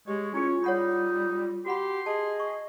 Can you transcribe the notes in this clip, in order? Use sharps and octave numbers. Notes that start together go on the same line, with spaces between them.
G#3 G4 C#5 D#5
C#4 E4 F4 G#4 C#5
G3 D#4 C#5 F#5 B5
F#4 G4 F#5 B5 C6
G#4 D#5 A5
C#6